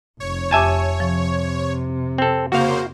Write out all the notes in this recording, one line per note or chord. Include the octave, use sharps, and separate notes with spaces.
F1 C#5
F2 G4 E5 G#5 A5 D6
C3 F3
C4 A4
C#3 A#3 F#4 C5 F5